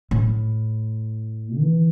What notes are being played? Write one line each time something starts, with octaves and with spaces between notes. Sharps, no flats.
A2
E3